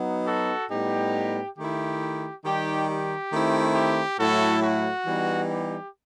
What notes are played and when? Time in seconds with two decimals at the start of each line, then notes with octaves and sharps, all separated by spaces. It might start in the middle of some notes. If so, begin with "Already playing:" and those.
Already playing: F#3 B3 D#4
0.26 F#4 A4
0.70 A2 G3 B3 D#4 G4
1.57 D#3 A3 E4 G4
2.44 D#3 G3 D#4 G4
2.89 G4
3.32 D#3 A3 C4 E4
3.75 G4
4.18 A2 F#3 A3 E4 F#4 A4
4.62 F#4
5.06 E3 G3 B3 D#4
5.49 G4